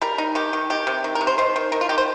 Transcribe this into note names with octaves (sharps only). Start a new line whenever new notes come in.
G3 A#4
D#4
D#3 G4
D#3
D#3 G4
C3
D#3
A#4
C3
C5
D#3 C5
D#3
D#3 A#4
F4
D#3 G4
C5